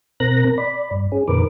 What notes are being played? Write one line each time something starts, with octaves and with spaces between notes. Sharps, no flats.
B2 C4 A#4 A#5 F#6 A#6
D5 B5
G2
C#4 G#4
F2 A#2 D#3 A#4 B4 D6